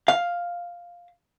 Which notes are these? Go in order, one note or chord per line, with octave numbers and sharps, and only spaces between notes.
F5